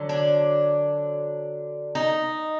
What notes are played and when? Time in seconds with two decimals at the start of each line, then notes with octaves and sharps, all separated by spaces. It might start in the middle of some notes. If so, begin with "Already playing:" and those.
Already playing: D3 F#3
0.09 D4
1.95 D#4